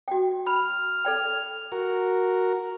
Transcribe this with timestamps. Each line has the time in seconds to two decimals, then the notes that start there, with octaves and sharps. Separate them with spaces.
0.08 F#4 G5
0.46 B5 F6
1.05 A4 D5 G5
1.72 F#4 A#4